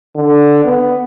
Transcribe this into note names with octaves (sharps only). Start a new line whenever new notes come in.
D3
B3